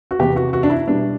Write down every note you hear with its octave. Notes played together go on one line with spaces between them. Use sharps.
F#4
E2 C3 E3 B3 G4
F#4
F#4
D4
E4
B2 G3 B3 D4